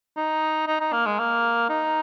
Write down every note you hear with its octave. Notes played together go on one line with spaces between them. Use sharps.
D#4
D#4
D#4
A#3
G#3
A#3
D#4